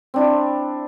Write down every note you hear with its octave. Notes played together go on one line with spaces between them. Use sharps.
C4 D4 E4